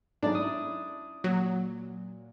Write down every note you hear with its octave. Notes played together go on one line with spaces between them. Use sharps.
G#2 F#3 A3 D4 D#4 G#4 D5 D#5
C#4 E4 D#6
A#2 F#3